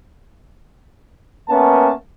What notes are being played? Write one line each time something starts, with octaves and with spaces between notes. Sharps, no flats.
A#3 B3 C#4 A#4 E5 A5